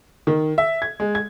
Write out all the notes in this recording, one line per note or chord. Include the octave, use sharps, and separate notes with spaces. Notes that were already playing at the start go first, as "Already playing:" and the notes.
D#3
E5
G#6
G#3
G#6